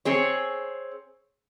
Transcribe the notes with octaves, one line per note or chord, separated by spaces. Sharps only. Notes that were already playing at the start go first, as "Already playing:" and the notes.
C4 G#4 C#5